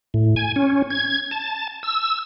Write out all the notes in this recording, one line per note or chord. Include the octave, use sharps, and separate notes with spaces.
A2
G#5
C#4
G#6
A5
E6